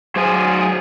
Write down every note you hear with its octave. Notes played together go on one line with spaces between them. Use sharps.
F#3 G#4 C5